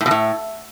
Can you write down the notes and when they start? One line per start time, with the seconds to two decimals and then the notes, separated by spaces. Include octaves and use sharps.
0.01 A2
0.06 B2
0.11 A2